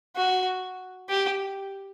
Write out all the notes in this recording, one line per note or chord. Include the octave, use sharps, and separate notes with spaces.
F#4
G4